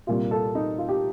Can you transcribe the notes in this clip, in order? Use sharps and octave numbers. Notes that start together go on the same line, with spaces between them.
C2 A#2 G3 F4
A4
D#4
F4
G4